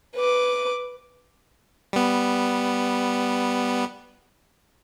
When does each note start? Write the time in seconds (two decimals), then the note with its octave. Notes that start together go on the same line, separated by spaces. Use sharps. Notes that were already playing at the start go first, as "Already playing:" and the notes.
0.16 B4 D6
1.93 G3 B3